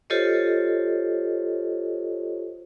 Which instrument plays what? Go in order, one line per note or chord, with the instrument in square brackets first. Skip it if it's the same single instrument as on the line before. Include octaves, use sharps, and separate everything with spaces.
[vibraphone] F4 G4 A4 C5 C#5 D#5